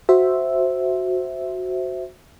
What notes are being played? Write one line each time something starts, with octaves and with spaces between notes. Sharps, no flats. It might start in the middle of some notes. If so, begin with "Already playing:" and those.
F#4 C5 E5